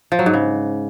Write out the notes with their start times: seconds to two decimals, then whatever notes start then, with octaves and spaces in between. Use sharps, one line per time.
0.12 F3
0.19 F#3
0.26 G#2
0.34 C#3